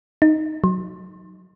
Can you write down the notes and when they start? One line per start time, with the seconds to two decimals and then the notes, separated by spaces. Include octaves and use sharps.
0.22 D#4
0.64 F#3